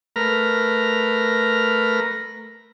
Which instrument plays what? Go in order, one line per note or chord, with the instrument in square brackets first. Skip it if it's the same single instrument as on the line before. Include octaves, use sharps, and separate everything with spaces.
[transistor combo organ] A3 A#4 B4 A#5 F6